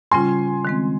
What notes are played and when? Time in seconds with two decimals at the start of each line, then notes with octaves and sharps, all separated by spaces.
0.11 C#3 G3 C#4 F4 G#5 C6
0.65 D#3 G#3 C4